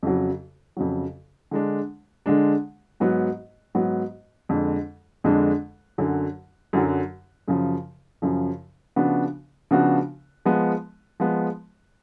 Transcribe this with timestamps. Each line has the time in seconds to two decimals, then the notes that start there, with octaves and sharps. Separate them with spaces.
0.03 F2 C#3 F#3
0.77 F2 C#3 F#3
1.51 D3 G#3 D4
2.26 D3 G#3 D4
3.00 G#2 F#3 B3
3.75 G#2 F#3 B3
4.49 F2 D3 G#3 D4
5.24 F2 D3 G#3 D4
5.98 F#2 D3 F#3
6.73 F#2 D3 F#3
7.48 F#2 C#3 F3
8.22 F#2 C#3 F3
8.96 C#3 F3 B3 D4 F#4
9.71 C#3 F3 B3 D4 F#4
10.45 F3 G#3 B3
11.20 F3 G#3 B3